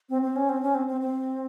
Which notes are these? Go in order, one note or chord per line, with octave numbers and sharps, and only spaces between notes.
C4
C4
C#4
C4
C#4
C4
C4
C4